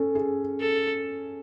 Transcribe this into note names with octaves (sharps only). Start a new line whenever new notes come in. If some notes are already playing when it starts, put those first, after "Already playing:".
Already playing: C#4 A4
G#4
A4